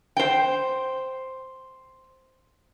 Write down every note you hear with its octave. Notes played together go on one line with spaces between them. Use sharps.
C5 G5